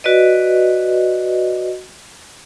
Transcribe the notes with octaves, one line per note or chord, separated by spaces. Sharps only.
F#4 B4 D5 D#5